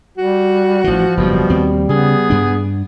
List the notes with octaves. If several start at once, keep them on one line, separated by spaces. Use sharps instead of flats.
G3 F#4
A1 E3 F3
F#1 E2 G2 B2 G3
D#2 C4
C#3 B3 G#4
G2 D4